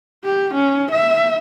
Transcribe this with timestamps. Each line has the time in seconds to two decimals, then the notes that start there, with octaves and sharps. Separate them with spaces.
0.24 G4
0.55 C#4
0.92 E5